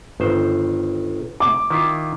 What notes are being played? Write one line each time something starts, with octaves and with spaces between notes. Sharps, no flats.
G1 D#3 C5
D6
D#3 E4 F4